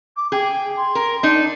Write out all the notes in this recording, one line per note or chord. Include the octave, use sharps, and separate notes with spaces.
D6
G#4 G5
C6
A#4
D4 D#4